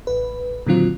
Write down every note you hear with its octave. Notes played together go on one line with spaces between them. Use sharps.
A1 B4
A#2 D3 D#3 F#3 C4 F4